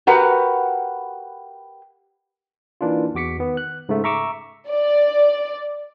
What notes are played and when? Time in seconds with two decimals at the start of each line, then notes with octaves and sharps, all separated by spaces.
0.07 F#4 G4 A#4 B4 F#5
2.81 E3 A#3 D4 D#4 F4
3.15 E2 F#4 D6 B6 C#7
3.39 D#3 B3
3.57 F#6
3.89 G#2 C#3 A3 E5
4.04 E5 A#5 C#6 D6 E6
4.69 D5